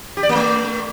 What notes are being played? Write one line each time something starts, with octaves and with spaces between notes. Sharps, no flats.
G4
D5
A#3
A3